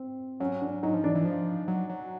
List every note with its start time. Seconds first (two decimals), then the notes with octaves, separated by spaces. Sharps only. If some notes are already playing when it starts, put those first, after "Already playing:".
Already playing: C4
0.40 F#3 C#4
0.62 D4
0.83 F#3 D#4
0.94 F3
1.04 E3 D4
1.15 E3
1.25 F3
1.68 F#3
1.90 F#3